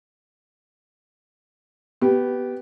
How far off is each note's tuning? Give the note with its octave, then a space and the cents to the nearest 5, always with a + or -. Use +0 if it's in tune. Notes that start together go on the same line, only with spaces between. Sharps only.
B3 +0 G4 -15